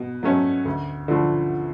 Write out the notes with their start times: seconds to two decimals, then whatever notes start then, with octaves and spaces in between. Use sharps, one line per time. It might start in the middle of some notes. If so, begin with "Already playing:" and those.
Already playing: B2
0.23 F#3 A3 C#4
0.65 D2
1.08 D3 F3 A3